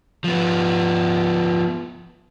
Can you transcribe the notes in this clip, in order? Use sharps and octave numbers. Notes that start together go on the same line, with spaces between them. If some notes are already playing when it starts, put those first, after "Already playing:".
F3 B3